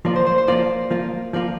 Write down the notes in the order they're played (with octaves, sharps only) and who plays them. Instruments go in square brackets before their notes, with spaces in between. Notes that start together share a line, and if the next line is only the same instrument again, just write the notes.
[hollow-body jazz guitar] F3 A#3 F4 [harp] D5
[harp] C5
C5
C5
[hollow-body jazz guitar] F3 A#3 F4 [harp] D5
[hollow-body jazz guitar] F3 A#3 F4
[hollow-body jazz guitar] F3 A#3 F4 [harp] D5